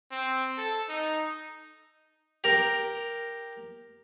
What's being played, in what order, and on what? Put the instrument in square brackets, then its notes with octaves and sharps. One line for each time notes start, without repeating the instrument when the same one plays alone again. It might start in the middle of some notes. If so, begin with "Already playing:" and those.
[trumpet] C4
A4
D#4
[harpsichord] G4 A#4